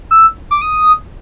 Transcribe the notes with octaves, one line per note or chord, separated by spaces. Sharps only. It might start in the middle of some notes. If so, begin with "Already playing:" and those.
E6
D6
D#6